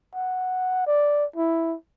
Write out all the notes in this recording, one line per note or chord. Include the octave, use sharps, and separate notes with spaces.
F#5
D5
E4